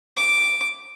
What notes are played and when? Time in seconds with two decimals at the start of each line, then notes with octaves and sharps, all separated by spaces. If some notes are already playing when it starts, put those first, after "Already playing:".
0.17 D6